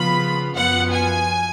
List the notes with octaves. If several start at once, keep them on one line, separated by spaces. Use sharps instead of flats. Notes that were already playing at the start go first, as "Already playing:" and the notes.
Already playing: C#3 F3 B3 F4 B5
F#2 F3 B3 F4 F#5
G#5